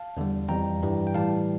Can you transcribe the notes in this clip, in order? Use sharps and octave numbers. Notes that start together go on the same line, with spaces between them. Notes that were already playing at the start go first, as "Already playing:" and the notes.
Already playing: F5 A5
E2 D3 G3
F2 E3 G3 G5 A#5
G2 E3 G3
G5
A2 E3 G3 F5 A5